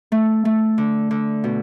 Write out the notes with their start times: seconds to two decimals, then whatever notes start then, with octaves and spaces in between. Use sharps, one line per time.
0.12 A3
0.45 A3
0.78 D3
1.11 D3
1.44 B2